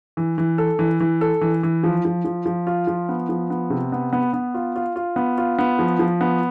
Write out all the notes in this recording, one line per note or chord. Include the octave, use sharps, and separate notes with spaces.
E3
E3
A4
E3
E3
A4
E3
E3
F3
F3
F3
F3
F4
F3
B3
F3
B3
C3
B3
B3
B3
F4
F4
F4
B3
F4
B3
F3
F3
B3